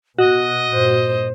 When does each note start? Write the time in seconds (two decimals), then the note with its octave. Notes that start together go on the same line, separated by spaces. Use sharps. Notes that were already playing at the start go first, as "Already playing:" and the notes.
0.19 B2 F#4 D#5
0.73 G2 A#2 C5